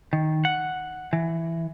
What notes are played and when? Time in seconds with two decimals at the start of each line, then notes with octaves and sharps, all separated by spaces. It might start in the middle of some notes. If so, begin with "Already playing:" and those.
0.13 D#3
0.45 F#5
1.13 E3